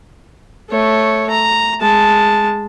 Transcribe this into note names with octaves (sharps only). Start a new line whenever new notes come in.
A3 C#5
A#5
G#3 A5